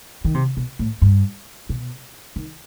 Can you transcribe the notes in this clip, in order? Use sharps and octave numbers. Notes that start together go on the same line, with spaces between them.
D#3
C3
B2
A2
G2
B2
D#3